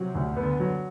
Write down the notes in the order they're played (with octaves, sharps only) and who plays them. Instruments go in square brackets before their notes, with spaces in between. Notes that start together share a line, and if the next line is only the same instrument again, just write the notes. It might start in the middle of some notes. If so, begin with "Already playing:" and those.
Already playing: [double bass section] C3 [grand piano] F#3
[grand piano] D2
[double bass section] D3 [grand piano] B3
[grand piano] F#3